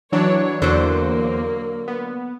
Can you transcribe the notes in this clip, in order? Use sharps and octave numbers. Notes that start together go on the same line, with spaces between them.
E3 F#3 D4 C#5
E2 D3 F#3 A#3 C5 D6
B3